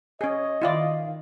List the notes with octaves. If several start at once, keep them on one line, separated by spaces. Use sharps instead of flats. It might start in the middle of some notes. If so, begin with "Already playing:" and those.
C#4 G#4 C#5 D#5
D#3 E4 F4 D5 F5